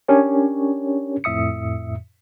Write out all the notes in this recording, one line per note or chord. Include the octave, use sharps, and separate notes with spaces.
C#4 D4 G4 A#4 C#5
F2 A2 E5 D#6 C#7